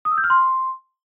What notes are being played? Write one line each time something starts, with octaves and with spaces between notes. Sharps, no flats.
D#6
E6
G6
F6
C6